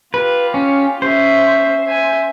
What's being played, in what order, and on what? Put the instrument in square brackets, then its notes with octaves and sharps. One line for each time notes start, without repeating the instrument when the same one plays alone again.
[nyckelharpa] F4 G4 [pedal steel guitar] B4
[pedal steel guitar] C#4
[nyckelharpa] C#4 E5 [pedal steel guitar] C5
[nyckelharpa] E5 G#5